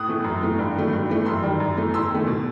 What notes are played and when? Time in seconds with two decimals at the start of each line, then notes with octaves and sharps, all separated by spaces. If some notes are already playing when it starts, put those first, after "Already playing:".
Already playing: A2 D#6 F#6
0.08 E3 A3
0.24 F#2
0.41 E3 A3
0.58 G2
0.75 D#3 F#3 A3
0.93 G2
1.10 E3 A3
1.25 F#2 C6 E6
1.43 D#3 G3
1.60 F#2
1.77 E3 A3
1.94 E2 C6 E6
2.10 D#3 A3
2.27 B2